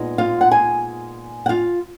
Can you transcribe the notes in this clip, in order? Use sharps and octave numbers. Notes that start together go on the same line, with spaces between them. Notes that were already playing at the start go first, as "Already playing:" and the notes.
Already playing: A#2 G#3 B3 D#4
F4 F5
F#5
G#4 G#5
F#5
F4 F5